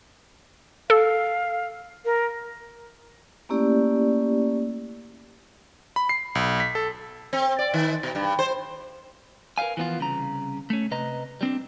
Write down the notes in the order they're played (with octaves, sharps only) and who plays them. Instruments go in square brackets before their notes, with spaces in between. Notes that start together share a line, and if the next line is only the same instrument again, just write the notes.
[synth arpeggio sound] A4 [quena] F5
[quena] A#4
[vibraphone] A3 A#3 C#4 E4 G4 D5
[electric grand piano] B5
C7
B1
B6
A4
[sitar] C4
D5
D#3
B2
G2
C5
[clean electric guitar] A#4 B4 E5 F5 G#5
E3 F3 B3 D#4 F4
C2 C#3 A#5
A3 C#4
C3 B4 D#5 A#5
G3 C4 D4